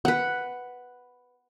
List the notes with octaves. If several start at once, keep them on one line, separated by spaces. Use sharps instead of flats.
B4 F#5